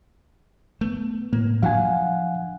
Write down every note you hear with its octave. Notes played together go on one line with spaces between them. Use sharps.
A3 B3
A2 A#3
F3 F#3 D4 F5 F#5 G#5